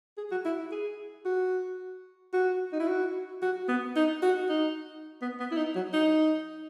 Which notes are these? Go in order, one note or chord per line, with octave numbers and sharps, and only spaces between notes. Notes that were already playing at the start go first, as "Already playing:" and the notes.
G#4
F#4
E4
G#4
F#4
F#4
D#4
E4
F#4
F#4
B3
D#4
F#4
D#4
B3
B3
E4
D#4
F#3
D#4